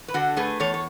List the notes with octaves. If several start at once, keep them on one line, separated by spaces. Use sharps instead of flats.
B4
D3 F#4 A4
A3 G#4 B4
E2 A4 C#5
C#5